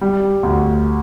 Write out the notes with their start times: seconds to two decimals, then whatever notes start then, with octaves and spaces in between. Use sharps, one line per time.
0.01 G3
0.43 D2